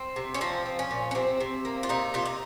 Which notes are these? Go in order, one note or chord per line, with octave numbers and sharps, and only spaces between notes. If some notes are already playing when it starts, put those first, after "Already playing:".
Already playing: C4
C3
C#4
F3 C4
F3
C#4
A#2
C#4
C3 C4
C3
A#3
F4
C3 D#4
C3 F4
D#4